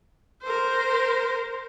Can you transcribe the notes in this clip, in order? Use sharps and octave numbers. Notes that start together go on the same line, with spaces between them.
A#4 C5